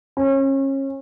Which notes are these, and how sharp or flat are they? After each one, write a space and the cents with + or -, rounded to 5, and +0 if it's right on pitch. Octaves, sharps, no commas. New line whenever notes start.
C#4 -30